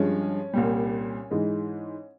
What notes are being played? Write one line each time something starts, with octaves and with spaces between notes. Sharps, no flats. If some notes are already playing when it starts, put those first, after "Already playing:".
Already playing: G2 F3 G#3 C#4
C2 A#2 G3
G#2 E3 G#3